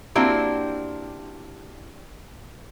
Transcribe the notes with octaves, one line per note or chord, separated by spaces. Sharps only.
A#3 C4 D4 E4 F#4 G4